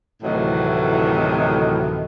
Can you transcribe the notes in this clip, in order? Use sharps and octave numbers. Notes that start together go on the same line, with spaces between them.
D2 A2 C3 D#3 E3 F#3